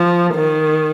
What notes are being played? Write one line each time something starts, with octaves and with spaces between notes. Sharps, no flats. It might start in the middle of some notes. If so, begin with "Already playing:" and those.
Already playing: F3
D#3